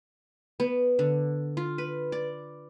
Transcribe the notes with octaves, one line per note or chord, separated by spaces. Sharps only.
B3
D3
F4
B4
D5